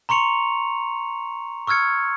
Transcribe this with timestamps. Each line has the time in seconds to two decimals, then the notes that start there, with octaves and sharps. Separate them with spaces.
0.09 A#5 C6 C#6 C#7 F7
1.67 C#6 E6 F6 G#6 C#7